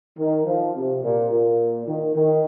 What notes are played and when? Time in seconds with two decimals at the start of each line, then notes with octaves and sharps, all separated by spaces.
0.18 D#3
0.45 F3
0.74 C3
1.02 A#2
1.30 A#2
1.86 D#3
2.14 D#3